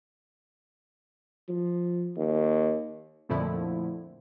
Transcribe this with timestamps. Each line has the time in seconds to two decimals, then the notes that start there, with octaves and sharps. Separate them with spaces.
1.48 F3
2.16 D#2
3.29 F2 A#2 D3 F3 A3 E4